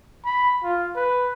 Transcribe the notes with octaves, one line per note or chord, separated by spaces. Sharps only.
B5
F4
B4